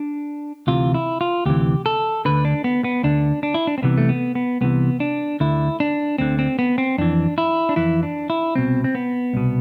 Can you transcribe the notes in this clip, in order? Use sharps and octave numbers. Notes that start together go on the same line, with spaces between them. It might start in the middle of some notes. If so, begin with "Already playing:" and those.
Already playing: D4
D2 C3 E3 F4
E4
F4
D2 C3 E3 G4
A4
D2 D3 B4
D4
B3
B3
D2 D3 D4
D4
E4
D4
C4
C2 C3 E3 B3
A3
B3
B3
C2 C3 E3 B3
D4
D2 D3 E4
D4
D2 D3 C4
C4
B3
C4
F2 E3 D4
E4
D4
F2 E3 E4
D4
E4
C2 B2 C4
C4
B3
C2 B2